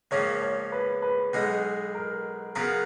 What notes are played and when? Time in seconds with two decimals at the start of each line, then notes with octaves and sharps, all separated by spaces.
0.11 C#2 C#3 F3 A#3 C#4 C#5
0.42 C#5
0.72 B4
1.02 B4
1.33 B1 B2 G#3 D#4
1.94 A#4
2.55 C#3 F#3 B3 F4 A#4 B4